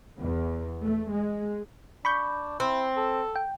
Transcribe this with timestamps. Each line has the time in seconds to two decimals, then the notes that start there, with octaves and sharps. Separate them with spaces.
0.20 E2
0.84 A3
1.13 G#3
2.05 D4 B5 C#6 G6
2.60 C4 E4
2.97 A4
3.36 G5